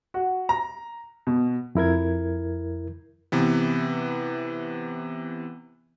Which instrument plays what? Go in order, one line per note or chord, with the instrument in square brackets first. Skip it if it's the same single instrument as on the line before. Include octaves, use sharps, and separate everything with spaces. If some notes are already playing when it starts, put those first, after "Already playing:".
[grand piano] F#4
A#5
B2
[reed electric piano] F2 E4 A#4 G#6
[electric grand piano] C3 E3 B3